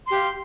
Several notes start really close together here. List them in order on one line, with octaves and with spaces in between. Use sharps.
C6 G4 F5